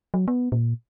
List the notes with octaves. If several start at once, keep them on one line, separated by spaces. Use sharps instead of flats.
F#3
B3
A#2